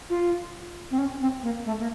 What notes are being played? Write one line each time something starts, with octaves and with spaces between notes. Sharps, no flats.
F4
C4
C#4
C4
A#3
A3
A#3